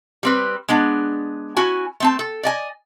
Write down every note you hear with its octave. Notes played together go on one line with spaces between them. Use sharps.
G3 C4 B4
G#3 B3 D4
C#4 E4 F#4 G#5
A3 C4 A5
A4
D5 D#5 G#5